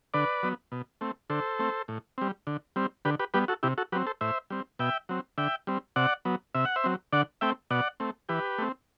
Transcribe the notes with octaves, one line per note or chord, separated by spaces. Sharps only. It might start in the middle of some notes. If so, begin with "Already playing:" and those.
D3 B4 D5
F#3 B3
B2
A3 C4
D3 A4 C5
A3 C4
A2
G3 C4
D3
G3 C4
D3 G4 B4
G4 B4
G3 B3 G4 B4
F#4 A4
C3 E4 G4
F#4 A4
F#3 C4 G4 B4
A4 C5
A2 C5 E5
G3 C4
B2 E5 G5
F#3 C4
D3 E5 G5
G3 C4
C3 D5 F#5
F#3 B3
C3 E5
F#5
C5 E5
F#3 C4
D3 D5 F#5
A3 C4 E5 G5
B2 D5 F#5
A3 C4
E3 G4 B4
A3 C4